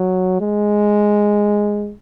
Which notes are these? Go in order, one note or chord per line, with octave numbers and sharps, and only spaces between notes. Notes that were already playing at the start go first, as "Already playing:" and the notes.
Already playing: F#3
G#3